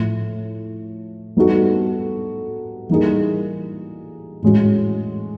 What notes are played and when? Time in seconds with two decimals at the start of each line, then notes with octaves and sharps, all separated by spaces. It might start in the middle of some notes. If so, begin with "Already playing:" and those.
Already playing: A2 F3 A3
1.37 G3 B3 D#4 F#4 A4
2.89 E3 G3 A#3 D#4 G#4
4.42 A2 E3 G#3 C#4 F#4